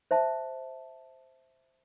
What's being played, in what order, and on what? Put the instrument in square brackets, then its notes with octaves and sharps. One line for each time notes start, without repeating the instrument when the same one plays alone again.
[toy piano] C5 E5 A5